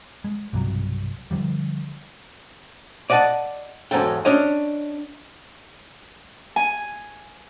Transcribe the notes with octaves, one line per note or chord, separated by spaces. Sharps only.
G#3
B1 G2 C3 F#3
D3 D#3 F3 G3
D5 D#5 F#5 G5 A5
E2 G#2 F#3 A4 G5
C#4 D4 C#5 D#5
G#5